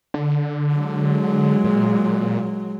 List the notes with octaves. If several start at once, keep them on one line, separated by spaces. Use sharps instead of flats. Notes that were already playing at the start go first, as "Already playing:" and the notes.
D3
F#3 G#3
A#2